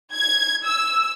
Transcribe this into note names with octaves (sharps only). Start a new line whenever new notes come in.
G#6
E6